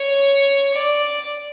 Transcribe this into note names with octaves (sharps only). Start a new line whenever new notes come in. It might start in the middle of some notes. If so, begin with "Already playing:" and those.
Already playing: C#5
D5